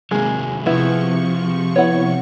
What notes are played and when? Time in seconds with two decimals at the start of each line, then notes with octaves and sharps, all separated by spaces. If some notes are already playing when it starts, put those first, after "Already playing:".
0.11 C3 D#3 F#3 G#3 A#3 G#4
0.66 C3 F3 B3 E4 C#6
1.76 B3 E4 C#5 F#5